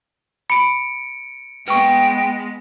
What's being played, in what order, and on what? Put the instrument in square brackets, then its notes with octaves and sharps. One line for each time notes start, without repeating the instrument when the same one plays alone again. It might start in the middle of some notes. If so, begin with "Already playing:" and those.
[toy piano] B5 [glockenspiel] C#7 D7
[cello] G#3 B3 [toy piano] B4 C#6 [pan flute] G5